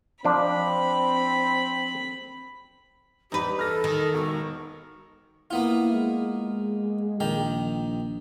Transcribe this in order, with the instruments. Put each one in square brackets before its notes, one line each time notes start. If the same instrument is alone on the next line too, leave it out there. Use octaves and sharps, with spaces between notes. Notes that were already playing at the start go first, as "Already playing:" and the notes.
[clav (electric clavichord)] F3 D4 [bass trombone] C4 [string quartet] B5
[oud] E2 B4 [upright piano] D#4 [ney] G4
[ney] A4 [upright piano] F6 A#6
[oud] D#3
[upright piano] E1 [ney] C#6
[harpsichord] A#3 B3 F4 [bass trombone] E4
[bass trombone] G#3
[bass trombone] A#1 [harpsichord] D#3 G4 A#5